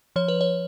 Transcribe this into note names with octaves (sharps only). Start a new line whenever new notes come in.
F3 C#5
B4
C#5